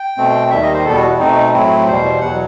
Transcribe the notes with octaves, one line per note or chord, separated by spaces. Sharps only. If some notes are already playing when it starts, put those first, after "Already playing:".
Already playing: G5
B2 A3 C4
D#2 D#3 G3 E5
D#5
C5
E2 B2 G3 B3 A4
F#4
E4
B2 A3 C4 D#4
A2 F#3 A3 C4 E4
E2 B2 G3 C5
E2 B2 F#3 F#5